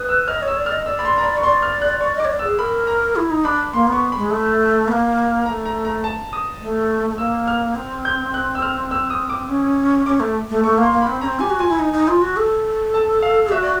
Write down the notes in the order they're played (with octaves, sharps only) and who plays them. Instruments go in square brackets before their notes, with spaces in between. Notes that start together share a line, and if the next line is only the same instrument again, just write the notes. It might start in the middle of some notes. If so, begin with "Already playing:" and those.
Already playing: [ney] B4 [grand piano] D#6
[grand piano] E6
[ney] D#5 [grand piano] F6
[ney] C#5
[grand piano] E6
[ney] D5
[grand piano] F6
[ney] D#5
[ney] D5 [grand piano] E6
[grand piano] B5
C6
A#5
B5
C#6
[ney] D5 [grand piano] C6
[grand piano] F6
F#6
[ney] D5 [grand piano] C#6
[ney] D#5 [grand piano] D6
[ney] C#5
D5
[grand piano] E6
[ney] G#4
[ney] A#4 [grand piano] B5
[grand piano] A#5
[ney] E4
D#4
[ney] D4 [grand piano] B5
[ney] A#3 [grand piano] C6
[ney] B3 [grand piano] C#6
[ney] G#3 [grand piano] B5
[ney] A3
B3
A#3
[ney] A#3 [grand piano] A#5
[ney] A3
[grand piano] A#5
A#5
A5
D#6
[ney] A3
A3
[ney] A#3 [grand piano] E6
[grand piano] F6
[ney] C4
[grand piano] G6
F#6
E6
F6
E6
D#6
D6
[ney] C#4
[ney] C#4 [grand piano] D6
[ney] A3
A3
[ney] A3 [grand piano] C#6
[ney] A#3
[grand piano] C6
[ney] A#3
[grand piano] B5
[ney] C4
[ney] C#4 [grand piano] A#5
[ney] C4
[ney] G4 [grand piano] G#5
[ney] F#4
[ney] F4 [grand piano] G#5
[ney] E4
D#4
D#4
F4
F#4
A4
[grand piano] A5
F5
[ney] F#4 [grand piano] E5
[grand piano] D5